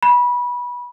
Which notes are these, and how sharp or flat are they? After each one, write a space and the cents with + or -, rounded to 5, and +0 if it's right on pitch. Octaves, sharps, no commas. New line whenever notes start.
B5 -20